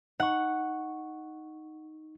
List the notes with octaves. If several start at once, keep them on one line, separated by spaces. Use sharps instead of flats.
D#4 F#5 C#6